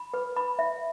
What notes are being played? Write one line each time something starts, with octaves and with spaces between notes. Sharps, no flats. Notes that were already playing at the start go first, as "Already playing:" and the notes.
Already playing: B5
B4
B5
E5